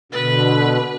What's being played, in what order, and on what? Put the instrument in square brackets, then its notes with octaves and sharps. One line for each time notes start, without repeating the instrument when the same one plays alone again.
[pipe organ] B2 D3 [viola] B4